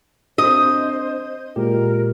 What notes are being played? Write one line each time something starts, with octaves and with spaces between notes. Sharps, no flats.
C4 D4 C5 D#5
A#2 G#3 G4 A#4